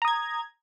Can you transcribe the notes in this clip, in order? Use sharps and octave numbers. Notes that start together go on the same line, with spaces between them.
A#5 D#6 G#6